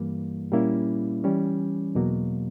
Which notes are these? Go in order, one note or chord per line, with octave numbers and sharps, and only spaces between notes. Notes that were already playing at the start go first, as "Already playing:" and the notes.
Already playing: G2 E3 G3 A#3
A#2 G3 A#3 C#4 E4
E3 G3 C#4
E2 B2 F#3 A#3